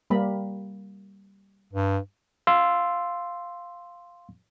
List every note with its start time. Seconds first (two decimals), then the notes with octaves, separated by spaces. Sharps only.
0.10 G3 A#3 B5
1.73 G2
2.47 F5 C6 E6